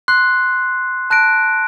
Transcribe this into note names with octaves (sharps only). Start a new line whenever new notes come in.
C6 D6 F#6 C7
A5 F#6 A#6 D7